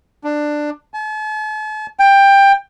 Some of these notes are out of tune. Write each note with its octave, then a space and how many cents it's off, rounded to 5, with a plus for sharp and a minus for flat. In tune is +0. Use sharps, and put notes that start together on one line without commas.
D4 +15
A5 -45
G5 +15